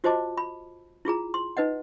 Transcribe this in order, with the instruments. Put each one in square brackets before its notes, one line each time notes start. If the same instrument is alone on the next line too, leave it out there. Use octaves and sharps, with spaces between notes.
[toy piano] F4 F#4 C5 D#5 A5 D6
B5
E4 F4 G#4 A#5
C6
D#4 B4 D#5 F#5